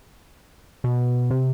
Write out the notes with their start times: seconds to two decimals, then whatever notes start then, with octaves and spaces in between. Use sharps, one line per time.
0.84 B2
1.30 C3